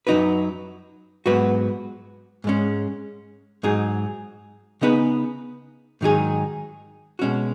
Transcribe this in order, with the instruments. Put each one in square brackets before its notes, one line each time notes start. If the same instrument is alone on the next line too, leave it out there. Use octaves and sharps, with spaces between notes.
[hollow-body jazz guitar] F#2 F#3 D#4 F#4 B4
G#2 F#3 B3 F#4 B4
G#2 G#3 C#4
G#2 F#3 D#4 G#4
C#3 B3 D#4 G#4 B4
G#2 D#3 F#3 D#4 G#4
B2 G#3 C#4 F#4